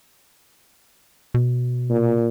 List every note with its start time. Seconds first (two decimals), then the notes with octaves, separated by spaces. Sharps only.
1.34 B2
1.90 A#2